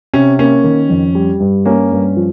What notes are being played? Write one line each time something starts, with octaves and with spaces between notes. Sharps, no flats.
C3 C#4
A#3 C#4
D#3
F2
G3
G2
A#3 C#4
G2
F3